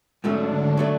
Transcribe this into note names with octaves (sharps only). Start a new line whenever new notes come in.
G#2 D3 F#3 A3 C#4 D4
F#3 A3 D4